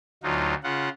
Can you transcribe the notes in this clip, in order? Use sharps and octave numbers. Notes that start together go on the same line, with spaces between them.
D2 F#3 D#4 F4
C#3 F4 F#5